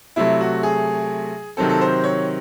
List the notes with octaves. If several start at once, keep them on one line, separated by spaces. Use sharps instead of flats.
C3 F#3 A3 E4
F#4
G#4
C3 D#3 F#3 C4 A4
A4
C5
C#5